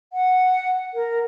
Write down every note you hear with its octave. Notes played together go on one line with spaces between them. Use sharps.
F#5
A#4